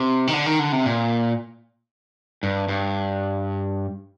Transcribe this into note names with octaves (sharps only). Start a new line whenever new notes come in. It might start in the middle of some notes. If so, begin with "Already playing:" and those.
Already playing: C3
D#3
D3
D#3
D3
C3
A#2
G2
G2